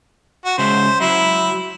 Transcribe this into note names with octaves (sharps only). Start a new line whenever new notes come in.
F#4
C#3 G#3 C5 E5
F#3 E4